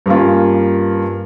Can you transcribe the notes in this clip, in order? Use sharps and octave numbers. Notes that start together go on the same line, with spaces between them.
G2 A#3 C#4 F4